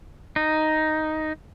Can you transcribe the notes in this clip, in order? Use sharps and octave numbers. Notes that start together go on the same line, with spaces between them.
D#4